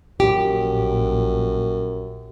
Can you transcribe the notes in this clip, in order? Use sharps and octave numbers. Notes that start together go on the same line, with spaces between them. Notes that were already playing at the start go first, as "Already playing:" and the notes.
A#1 F#2 G4